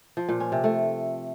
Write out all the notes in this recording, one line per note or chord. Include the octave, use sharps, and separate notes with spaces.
F3
A#2
C#4
C3
A3